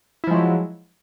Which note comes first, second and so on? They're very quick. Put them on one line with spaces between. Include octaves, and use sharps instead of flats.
E4 F3 G#3 F#3